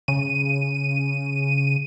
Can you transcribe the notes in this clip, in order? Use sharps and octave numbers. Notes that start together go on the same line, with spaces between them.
C#3 D#7